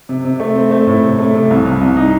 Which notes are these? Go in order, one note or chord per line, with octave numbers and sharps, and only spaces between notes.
C3
C3
A3
C4
A3
A2
C3
A3
C3
C2
C2
C2
D#4